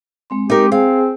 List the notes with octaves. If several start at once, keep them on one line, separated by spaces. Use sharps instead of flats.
G#3 C4 C6
D#4 G4 A#4
C4 G#4 F5 G#5